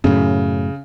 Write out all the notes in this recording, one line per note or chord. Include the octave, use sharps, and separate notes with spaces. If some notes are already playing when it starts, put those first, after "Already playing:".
F#2 A2 C#3